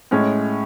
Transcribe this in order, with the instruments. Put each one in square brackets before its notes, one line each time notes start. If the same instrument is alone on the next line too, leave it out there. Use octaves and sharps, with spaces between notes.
[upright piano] A2 G#3 C#4